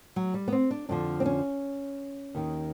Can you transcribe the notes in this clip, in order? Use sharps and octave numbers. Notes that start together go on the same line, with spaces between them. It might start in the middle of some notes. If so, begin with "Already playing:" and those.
F#3
G3
B3
C4
D4
F2 D3 F3 D4
C4
C#4
D#2 D#3